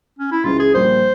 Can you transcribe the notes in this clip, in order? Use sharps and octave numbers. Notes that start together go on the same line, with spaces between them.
C#4
E4
C#2 C#3 E3 F4
G#4
A#1 A#2 G3 A#3 C5